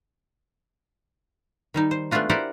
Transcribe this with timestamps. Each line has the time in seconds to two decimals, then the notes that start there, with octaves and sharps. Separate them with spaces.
1.74 D#3 G3 D#4
1.91 C5
2.11 G#3 A3 B3 D4 F4 F#4
2.29 E4 G4 A#4 C5 D5 F#5